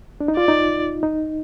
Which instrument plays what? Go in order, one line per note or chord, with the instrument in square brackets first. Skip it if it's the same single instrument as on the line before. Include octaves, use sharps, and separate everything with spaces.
[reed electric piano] D4
D#4
[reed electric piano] F4 [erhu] D5
[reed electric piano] D#4
D#4